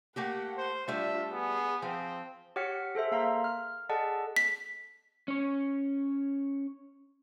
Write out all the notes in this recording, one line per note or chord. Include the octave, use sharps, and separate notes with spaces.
A3 A#3 G4 F#5 G5
C5
G3 A3 D4 F4 E5
B3 G#4 G#5
F3 C4
G4 C#5 F#5 F6 B6 C#7
G#4 A4 C5 E5
A#3 F5 A#5 C6
F6
G#4 A4 D5 D#5 F#5 A5
B6
C#4 C#5